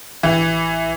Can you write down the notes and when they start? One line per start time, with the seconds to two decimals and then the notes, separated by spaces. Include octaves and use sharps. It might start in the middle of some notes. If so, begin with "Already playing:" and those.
0.23 A1 E3